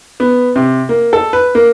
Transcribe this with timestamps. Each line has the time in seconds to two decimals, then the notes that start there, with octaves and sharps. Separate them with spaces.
0.20 B3
0.56 C3
0.89 A#3
1.13 A4
1.33 B4
1.55 A#3